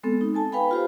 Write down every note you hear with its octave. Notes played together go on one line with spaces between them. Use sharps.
G#3 B3 C4 A4
D#4
A4 G#5 A5
B4 F5 G5 G#5 B5
F4 G4 C5